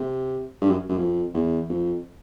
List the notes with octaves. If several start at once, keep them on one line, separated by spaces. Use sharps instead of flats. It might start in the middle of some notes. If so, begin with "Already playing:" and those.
Already playing: C3
G2
F#2
F#2
F2
E2
F2